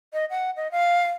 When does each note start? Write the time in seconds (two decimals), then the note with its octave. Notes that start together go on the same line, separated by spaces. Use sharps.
0.13 D#5
0.30 F#5
0.57 D#5
0.72 F5